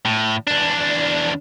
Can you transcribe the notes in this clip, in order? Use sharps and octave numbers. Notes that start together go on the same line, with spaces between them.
A2
E2 D4